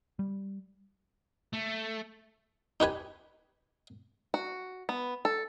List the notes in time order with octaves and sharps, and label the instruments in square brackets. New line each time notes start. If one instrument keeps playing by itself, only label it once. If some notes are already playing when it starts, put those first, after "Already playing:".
[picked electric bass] G3
[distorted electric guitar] A3
[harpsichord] D#4 G4 B4 G#5
[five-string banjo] F#4
B3
A4